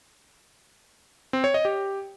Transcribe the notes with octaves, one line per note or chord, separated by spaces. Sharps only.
C4
C#5
D#5
G4